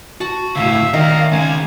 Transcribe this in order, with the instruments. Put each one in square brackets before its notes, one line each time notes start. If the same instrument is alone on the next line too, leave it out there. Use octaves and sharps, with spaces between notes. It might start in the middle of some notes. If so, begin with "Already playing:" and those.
[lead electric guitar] F#4 [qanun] A5
[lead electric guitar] C#2 A2 [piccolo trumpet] E5 [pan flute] F5
[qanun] D#3 [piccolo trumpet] A#4 [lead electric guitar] D5 E5
[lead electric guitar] G#3 C#4 [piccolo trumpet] G#5